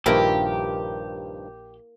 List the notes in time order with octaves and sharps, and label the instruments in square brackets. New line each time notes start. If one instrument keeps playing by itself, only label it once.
[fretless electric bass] A#1 [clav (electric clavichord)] G2 D#3 F3 [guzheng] A#3 E4 A#4 [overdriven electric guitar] G4